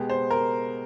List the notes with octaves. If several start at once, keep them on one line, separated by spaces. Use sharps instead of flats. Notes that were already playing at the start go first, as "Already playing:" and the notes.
Already playing: B2 G#3 B3 G4
C5
A#4